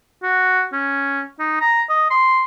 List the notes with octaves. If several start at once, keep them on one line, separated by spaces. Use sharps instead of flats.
F#4
C#4
D#4
A#5
D#5
C6